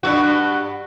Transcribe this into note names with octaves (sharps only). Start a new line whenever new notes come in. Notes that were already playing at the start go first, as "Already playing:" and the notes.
G2 A#2 F#4